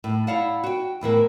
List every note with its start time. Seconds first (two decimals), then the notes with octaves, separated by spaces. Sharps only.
0.04 A2
0.27 E4 D5 F5 F#5 A5
0.64 F#4 G5
1.01 E2 A2 E3 A#4